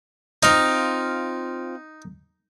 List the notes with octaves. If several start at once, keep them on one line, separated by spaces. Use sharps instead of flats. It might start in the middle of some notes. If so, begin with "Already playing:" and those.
C4 D#4 F4 F5